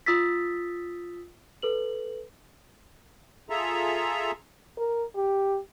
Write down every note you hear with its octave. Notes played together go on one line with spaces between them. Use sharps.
F4 D#6 E6 A6 B6
A4 B4 F#7
F4 G#4 A4 E5 A#5
A#4
G4